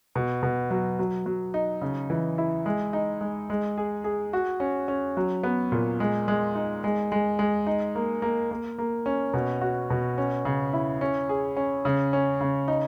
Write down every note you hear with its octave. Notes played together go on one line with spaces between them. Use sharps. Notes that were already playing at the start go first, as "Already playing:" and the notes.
B2
B2
F#3
F#3
F#3
D#4
C#3
E3
E4
G#3
D#4
G#3
G#3
G#4
G#4
F#4
C#4
C#4
F#3
B3
A#2
G#3
G#3
D#4
G#3
G#3
G#3
D#4
A#3
A#3
A#3
A#3
C#4
B2
F#4
B2
C#4
C#3
E4
C#4
G#4
C#4
C#3
C#4
C#3
D#4